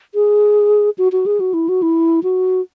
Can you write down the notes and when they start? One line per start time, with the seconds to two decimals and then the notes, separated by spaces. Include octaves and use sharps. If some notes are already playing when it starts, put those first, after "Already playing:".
0.14 G#4
0.98 F#4
1.12 F#4
1.26 G#4
1.40 F#4
1.54 E4
1.69 F#4
1.82 E4
2.23 F#4